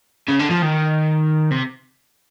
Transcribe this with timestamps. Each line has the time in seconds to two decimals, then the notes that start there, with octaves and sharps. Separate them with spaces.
0.29 C#3
0.40 D3
0.51 F3
0.62 D#3
1.51 C3